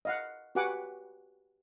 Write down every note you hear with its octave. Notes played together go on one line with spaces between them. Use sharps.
D#5 F5 F#5
F#4 G4 B4 F#5 G#5 D6